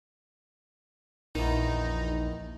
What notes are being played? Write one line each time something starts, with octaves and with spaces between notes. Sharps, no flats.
A#1 E2 D#3 D#4